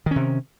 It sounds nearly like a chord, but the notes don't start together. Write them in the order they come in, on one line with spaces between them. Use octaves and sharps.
D#3 C#4 C3